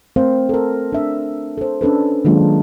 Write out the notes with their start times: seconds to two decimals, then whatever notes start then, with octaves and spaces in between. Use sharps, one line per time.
0.16 A3 C4 A#4 C5 F5
0.49 A4 A#4
0.93 D4 E5
1.58 A4 C5
1.81 C#4 D4 A4 B4
2.25 D#3 F#3 G#3 A#3 D4 F4